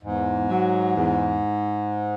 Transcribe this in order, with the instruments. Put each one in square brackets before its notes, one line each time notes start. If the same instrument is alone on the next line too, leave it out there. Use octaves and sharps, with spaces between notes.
[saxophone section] E2 [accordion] G#2
[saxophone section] F#3
E2